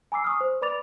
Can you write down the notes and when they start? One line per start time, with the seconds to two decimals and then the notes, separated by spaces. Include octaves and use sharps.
0.12 G#5 A#5 B5 D6 E6 C7
0.24 C#6 D#6 F6
0.41 C5
0.61 B4 D5 B5 D6 A6 F7